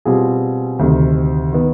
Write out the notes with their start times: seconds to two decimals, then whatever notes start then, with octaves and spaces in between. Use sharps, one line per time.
0.05 B2 G3 C4 F4 G#4
0.79 D2 C3 D#3
1.53 D#3 B3